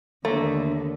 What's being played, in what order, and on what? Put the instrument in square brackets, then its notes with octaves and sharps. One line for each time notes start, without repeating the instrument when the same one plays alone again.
[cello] D#2 D3 [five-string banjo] A3 A#3